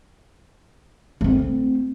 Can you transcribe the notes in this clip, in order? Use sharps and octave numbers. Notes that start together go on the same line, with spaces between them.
A3 C4